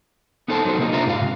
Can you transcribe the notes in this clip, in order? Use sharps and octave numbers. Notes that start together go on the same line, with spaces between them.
B3 D#4 A4 C5 A5
F#3 D#4 A4 C5
C3 A#3 D#4
D4 F4 C5 E5 A#5
G#2 F5
C3